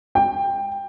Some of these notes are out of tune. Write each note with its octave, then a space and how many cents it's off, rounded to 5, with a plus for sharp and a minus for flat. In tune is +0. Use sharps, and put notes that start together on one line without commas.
G5 +15